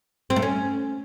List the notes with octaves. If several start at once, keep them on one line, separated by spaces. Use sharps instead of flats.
C4
A3
C#4